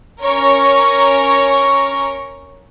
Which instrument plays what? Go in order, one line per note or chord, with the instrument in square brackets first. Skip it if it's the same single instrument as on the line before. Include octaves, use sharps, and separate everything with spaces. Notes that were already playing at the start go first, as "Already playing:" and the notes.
[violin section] C#4 A#4 C#5 A#5 C#6